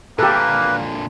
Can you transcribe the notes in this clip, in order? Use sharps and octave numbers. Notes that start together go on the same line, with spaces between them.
A#2 D3 A#3 G4 A4 B4